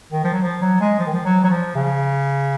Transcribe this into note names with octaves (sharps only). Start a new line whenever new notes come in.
D#3
F3
F#3
F3
F#3
G#3
F3
D#3
F3
F#3
F#3
F3
C#3